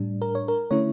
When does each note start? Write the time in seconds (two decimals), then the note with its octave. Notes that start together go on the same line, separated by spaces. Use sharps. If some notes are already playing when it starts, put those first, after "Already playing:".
Already playing: A2 G3 D4
0.22 A#4
0.35 C#5
0.48 A#4
0.71 D3 A3 C#4 E4 C#5